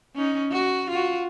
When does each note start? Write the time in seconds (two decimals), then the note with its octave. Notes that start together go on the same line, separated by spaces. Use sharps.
0.15 C#4 D#4
0.51 F#4
0.90 F4 F#4